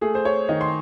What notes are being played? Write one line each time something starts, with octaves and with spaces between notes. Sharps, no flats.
A3 G#4
C5
C#5
D#3 D#5
C6